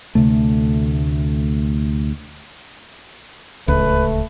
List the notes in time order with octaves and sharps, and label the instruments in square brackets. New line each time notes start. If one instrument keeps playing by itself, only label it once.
[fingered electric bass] D2 C3 A3
[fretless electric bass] D1 C#2 [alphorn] A3 [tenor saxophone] B4